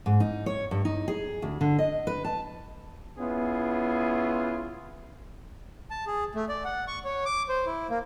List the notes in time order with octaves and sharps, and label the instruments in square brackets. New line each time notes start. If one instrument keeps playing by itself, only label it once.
[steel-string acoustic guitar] G#2
D#4
C#5
G2
D#4
G#4
D2
D3
D#5
B4
A5
[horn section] B3 C#4 E4 F4 G#4
[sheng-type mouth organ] A5
G#4
A3
D5
F#5
C#6
C#5
D6
C5
E4
A#3